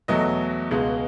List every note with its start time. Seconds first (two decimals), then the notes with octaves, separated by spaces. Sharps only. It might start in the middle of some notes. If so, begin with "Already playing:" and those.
0.08 E2 B2 F#3 A3 D#5
0.71 C#2 B2 G#3